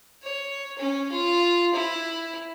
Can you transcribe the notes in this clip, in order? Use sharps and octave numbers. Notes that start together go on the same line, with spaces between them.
C#5
C#4
F4
E4